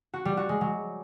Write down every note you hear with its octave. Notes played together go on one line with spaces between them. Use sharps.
F#4
G3
F#4
G#3
F#3